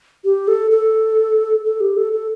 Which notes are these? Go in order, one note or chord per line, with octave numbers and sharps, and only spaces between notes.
G4
A4
A4
A4
G4
A4
A4